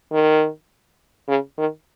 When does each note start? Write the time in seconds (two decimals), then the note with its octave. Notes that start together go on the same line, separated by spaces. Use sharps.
0.12 D#3
1.28 C#3
1.58 D#3